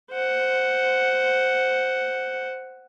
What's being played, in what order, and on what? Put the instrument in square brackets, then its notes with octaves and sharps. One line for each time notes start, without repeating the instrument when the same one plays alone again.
[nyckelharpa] C5 F#5